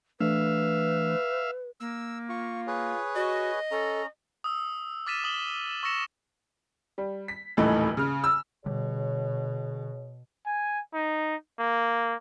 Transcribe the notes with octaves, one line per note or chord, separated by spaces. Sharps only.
E3 A3 D4 B4 E5 F5
A#3 E6
F4 C#6
G#4 B4 C#5
F#4 D#5
C#4 A4 A#5
D#6 E6
D6 F6 A6 B6 D#7 E7
D#6 F#7 G7
E7
C#6 E6 A#6 C#7 E7
G3
B6
D#1 C#2 A2 E3 A3 D#4
C#3 F6
E6
B2 D3 G3 G#4 C#5
G#5
D#4
A#3